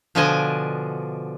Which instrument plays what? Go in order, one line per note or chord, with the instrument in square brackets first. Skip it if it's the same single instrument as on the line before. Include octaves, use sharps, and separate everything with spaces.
[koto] B2 D3 F3 D4 D#5 G#5